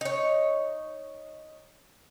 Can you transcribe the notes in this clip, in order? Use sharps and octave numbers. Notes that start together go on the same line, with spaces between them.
D#4 C#5